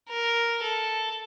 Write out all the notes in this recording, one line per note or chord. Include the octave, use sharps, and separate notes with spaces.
A#4
A4